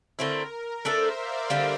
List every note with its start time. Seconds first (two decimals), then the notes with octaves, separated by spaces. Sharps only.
0.19 D3 A3 C4 E4 A#4
0.84 A3 D4 A4 C5 E5
1.18 D5 F5
1.50 D3 G3 A#3